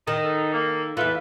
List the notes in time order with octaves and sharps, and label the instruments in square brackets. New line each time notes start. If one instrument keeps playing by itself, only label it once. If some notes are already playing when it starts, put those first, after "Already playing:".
[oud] D#3 [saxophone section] D#4
[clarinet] A4
[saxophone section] A#3
[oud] E2 F4 [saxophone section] A4 B4 [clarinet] E5